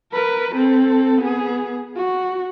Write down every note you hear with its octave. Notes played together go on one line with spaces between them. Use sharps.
A#4 B4
C4 A4
B3 G#4
F#4